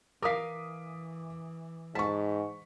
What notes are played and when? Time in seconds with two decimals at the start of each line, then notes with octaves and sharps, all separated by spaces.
0.22 E3 A#4 F5 D6 D#6 B6
1.95 G#2 A5 C#6 B6